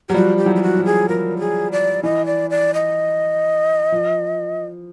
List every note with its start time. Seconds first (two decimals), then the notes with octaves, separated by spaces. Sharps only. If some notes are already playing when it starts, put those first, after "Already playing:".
0.09 F#3 G4
0.14 F3 G3 F#4
0.38 G4
0.46 E3 F#3
0.56 G4
0.62 F#4
0.77 F3
0.85 G#4
1.09 F3 A#4
1.37 G4
1.40 G#4
1.72 D5
2.03 E3 D#5
2.26 D5
2.50 D5
2.74 D#5
3.92 F3